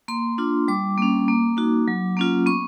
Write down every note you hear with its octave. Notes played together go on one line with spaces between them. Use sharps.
A#3 C6
D4 F4
G3 D6
A#3 C#4
A#3
D#4 F#4
F#3
A#3 C#4 F4
B3 C#6